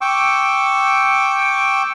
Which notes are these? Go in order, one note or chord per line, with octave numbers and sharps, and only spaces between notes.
G5 C#6 D6 E6